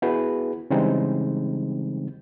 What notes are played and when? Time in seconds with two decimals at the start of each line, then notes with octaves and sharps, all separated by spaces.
0.02 B3 E4 F#4 G#4 B4
0.70 C#3 E3 G3 G#3 C4 D#4